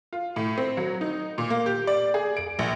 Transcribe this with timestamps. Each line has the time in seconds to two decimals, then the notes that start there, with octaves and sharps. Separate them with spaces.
0.13 F4
0.36 A2
0.58 C4
0.77 F#3
1.01 D#4
1.38 A#2
1.50 A#3
1.66 G4
1.87 D5
2.14 G#4
2.37 D7
2.59 A#1